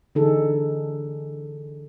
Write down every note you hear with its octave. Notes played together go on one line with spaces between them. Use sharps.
D3 E3 D4 D#4 G#4 A4